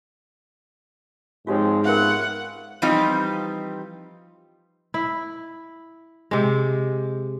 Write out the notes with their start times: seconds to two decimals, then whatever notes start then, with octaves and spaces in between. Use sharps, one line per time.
1.47 G#2 F3 G#3 C4 F4 G4 C#5
1.85 B3 C#4 F4 A#4 E5 F#5
2.82 E3 F3 G3 C4 D#4 F4
4.94 E4
6.31 C3 G#3